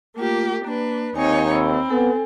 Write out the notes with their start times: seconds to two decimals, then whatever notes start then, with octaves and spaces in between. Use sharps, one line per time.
0.17 A3 A#3 F4 G4
0.65 A#3 D4 B4
1.16 D#2 C4 D#4 C#5 G#5
1.51 C4 B5 E6
1.90 B3 A4 G#5